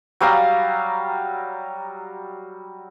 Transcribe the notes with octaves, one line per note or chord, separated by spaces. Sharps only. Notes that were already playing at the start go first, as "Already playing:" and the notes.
F#3 G3 F5 A#5